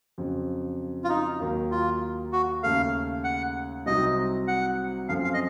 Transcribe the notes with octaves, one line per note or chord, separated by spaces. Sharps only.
F2 C#3 F#3
F4
D#4
D#2 D#3 F#3 A#3
F4
F#4
D#2 C#3 A3 F5
F#5
C2 C3 F#3 C4 D#4 D#5
F#5
F#2 F3 C4 F4 A4 F5
F5
D#5